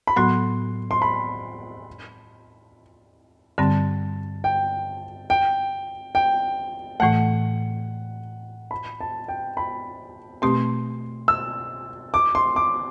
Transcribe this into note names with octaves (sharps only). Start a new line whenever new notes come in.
B5
A2 F#3 B3 F#4 C6
C6
B5
G2 D3 G3 C4 A5
G5
G5
G5
A2 E3 A3 F#5
B5
A5
G5
B5
B2 A3 C4 G4 C6
E6
D6
C6
D6